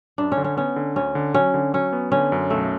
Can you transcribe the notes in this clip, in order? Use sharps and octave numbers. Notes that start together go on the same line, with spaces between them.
F#2 D4
C#4
D3
C#4
B3 C#4
D3
D2 C#4
D3
F#3 C#4
D3
F#3 C#4
B3
D3 C#4
F#2
B1 A3